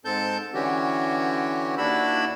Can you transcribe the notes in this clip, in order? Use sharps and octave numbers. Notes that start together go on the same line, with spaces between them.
G#2 C4 A4 A5 G6
D3 E3 C#4 F#4 G4
D#2 D4 E4 F#4 B5 E6